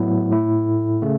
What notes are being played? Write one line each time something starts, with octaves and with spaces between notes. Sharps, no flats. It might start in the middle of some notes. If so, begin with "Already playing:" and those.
Already playing: A2 F#3 B3 E4
A2 A3 E4
C#3 A3